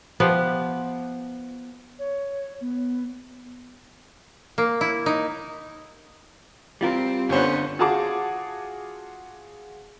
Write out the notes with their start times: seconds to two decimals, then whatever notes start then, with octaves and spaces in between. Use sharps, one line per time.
0.20 F3 B3 G4
1.99 C#5
2.61 B3
4.58 A#3
4.81 E4
5.06 D#4
6.81 G3 C4 F4 A#4
7.29 G1 D3 B3 C#4 C5 C#5
7.79 F4 F#4 G#4 A5 D6